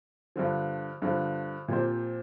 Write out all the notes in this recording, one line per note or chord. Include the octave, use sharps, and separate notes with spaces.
G2 D3 F3
G2 D3 F3
A#2 F3 C4 G4 C5